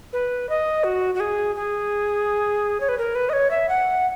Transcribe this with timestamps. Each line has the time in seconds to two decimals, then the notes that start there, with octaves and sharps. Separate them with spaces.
0.13 B4
0.49 D#5
0.84 F#4
1.15 F#4
1.20 G#4
1.56 G#4
2.80 C#5
2.89 B4
2.98 A#4
3.15 B4
3.29 D#5
3.33 C#5
3.51 E5
3.69 F#5